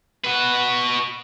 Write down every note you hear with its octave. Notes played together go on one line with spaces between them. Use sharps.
F#4 B4